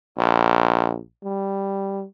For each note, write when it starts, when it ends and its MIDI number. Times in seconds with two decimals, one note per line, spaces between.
0.18 0.99 34
1.24 2.04 55